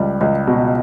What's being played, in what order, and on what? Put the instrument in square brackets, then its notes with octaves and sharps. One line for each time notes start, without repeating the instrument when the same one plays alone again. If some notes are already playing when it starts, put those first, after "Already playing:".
Already playing: [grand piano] C#2 G3
C#2
B2